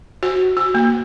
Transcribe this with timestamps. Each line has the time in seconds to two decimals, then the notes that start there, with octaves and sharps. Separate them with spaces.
0.23 F#4
0.57 F#4
0.75 A#3